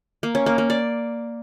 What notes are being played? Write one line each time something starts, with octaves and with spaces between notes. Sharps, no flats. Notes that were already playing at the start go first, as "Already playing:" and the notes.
A#3
C#4
A#3
A#3
D5